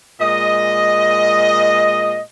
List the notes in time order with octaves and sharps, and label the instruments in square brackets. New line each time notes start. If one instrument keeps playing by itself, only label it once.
[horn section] A#2 G#3 D#5